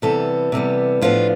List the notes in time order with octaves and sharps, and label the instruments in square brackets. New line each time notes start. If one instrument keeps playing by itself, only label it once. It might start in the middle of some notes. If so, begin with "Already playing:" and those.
[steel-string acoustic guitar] C3 E3 G3 B3 A4
C3 E3 G3 B3
A2 F3 B3 D4 F4